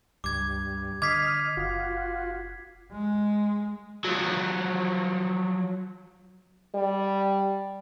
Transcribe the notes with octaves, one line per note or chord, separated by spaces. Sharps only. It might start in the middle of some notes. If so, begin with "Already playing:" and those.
C#2 G2 D6 G#6
D3 D#5 D6 F6 G#6 B6 C7
F#1 F4 F#4
G#3
F3 F#3
G3